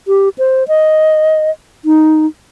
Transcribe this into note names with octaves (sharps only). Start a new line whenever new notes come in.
G4
C5
D#5
D#4